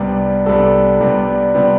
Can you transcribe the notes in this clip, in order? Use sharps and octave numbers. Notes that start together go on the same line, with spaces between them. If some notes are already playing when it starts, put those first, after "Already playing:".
Already playing: C2 C3 G3 B3 D4
C2 C3 G3 B3 D4 A4
C2 C3 G3 B3 D4
C3 G3 B3 D4